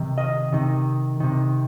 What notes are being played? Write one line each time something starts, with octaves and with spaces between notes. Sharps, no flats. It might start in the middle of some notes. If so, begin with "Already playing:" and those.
Already playing: C3 D#3
D#5
C3 D#3
C3 D#3